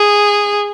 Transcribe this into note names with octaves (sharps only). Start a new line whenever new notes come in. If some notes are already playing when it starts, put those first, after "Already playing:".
Already playing: G#4